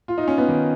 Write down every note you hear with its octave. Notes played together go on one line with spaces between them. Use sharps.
F4
D#4
C#4
B3
D#3